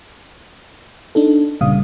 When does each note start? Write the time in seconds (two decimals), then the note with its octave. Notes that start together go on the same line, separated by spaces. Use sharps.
1.15 D4 D#4 A4
1.61 G1 A#2 C#3 G3 F5 D#6